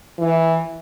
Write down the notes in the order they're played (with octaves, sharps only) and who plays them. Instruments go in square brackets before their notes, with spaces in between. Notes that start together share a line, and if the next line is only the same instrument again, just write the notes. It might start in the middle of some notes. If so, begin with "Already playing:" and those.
[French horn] E3